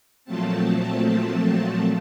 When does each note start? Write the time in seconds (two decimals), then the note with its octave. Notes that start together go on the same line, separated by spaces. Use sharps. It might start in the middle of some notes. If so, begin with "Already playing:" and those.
0.25 A#2 F3 F#3 A3 C4 A5